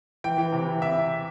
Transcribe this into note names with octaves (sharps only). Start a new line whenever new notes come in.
E3 G5
E3
C3
E3
C3 E5